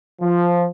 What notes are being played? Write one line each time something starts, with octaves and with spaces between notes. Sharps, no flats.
F3